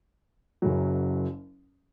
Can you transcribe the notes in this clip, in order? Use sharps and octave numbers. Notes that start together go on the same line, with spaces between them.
F#1 F#2 C#3 F#3